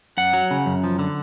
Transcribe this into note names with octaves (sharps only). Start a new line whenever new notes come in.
F#2 F#5
F#3
C#3
F#2
F3
D3